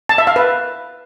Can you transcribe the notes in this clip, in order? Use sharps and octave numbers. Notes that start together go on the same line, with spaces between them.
A5
E5
F5
B4